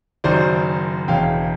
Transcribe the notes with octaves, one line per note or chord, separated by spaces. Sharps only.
F#1 F#2 D#3 C5 D5
E1 E2 C#3 F5 G5